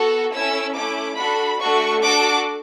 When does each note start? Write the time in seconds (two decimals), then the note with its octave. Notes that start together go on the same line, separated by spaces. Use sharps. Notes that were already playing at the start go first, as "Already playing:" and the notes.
Already playing: B3 F#4 A4
0.34 C#4 E4 A4 E6
0.76 A3 C#4 E4 D6
1.18 D4 F#4 A4 B5
1.61 A3 D4 F#4 A4 C#6
2.03 D4 F#4 A4 D6